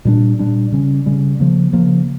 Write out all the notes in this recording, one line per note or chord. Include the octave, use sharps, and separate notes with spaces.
A#2 G3 D4
A#2 G3 D4
C#3 G3 C#4
C#3 G3 C#4
C#3 F3 A#3
C#3 F3 A#3